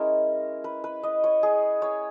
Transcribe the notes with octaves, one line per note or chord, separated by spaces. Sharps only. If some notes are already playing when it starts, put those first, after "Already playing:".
Already playing: G#3 C#4 E4 A#4
B4
B4
D#5
C#5
G#4
C#5